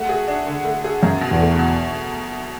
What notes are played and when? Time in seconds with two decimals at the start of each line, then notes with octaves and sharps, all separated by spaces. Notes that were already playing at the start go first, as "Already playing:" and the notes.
Already playing: A3 F#4
0.09 G#4
0.28 D4
0.47 D3
0.65 A3
0.84 G#4
1.03 F#2 F#3
1.21 B2
1.31 E2
1.40 A3
1.59 B2